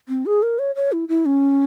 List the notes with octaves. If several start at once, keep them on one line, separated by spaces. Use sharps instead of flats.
C4
G#4
A#4
C#5
C#5
E4
E4
C#4